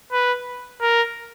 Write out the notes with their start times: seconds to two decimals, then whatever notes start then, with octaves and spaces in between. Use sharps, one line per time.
0.12 B4
0.81 A#4